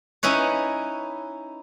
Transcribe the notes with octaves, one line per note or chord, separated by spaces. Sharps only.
C#4 D#4 E4 B4 C#5